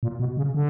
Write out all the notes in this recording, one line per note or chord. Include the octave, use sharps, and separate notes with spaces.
A#2
B2
C#3
D3